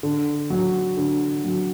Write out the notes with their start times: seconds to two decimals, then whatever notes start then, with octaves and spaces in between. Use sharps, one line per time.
0.03 D3
0.50 F#3
0.97 D3
1.44 F#3